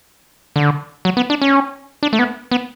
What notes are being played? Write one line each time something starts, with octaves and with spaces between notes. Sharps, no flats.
D3
F#3
B3
D4
C#4
D4
A3
B3
B3